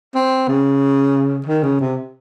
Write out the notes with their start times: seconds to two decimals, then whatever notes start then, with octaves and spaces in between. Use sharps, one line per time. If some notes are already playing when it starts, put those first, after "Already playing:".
0.15 C4
0.48 C#3
1.46 D#3
1.63 C#3
1.80 C3